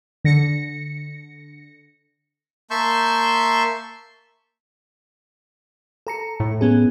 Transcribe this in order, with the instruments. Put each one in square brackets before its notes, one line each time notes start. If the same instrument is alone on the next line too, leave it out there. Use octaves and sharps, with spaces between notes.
[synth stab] D3 A#6 C#7
[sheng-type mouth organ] A#3 E5 A5 C6 C#6 G6
[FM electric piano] A4 A#5 C#7
[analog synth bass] A2
[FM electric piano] B3 C#4 G#4